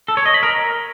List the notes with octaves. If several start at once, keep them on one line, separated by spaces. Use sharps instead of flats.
A4
C#5
D#5
B5
A#4